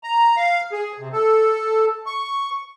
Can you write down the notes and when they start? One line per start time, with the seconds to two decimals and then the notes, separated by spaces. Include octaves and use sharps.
0.03 A#5
0.37 F5
0.72 G#4
0.99 C3
1.12 A4
2.06 C#6